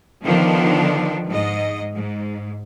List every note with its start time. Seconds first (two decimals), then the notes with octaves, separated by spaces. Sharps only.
0.23 D3 D#3 F3 B3 D4
1.28 G#2 D#5
1.94 G#2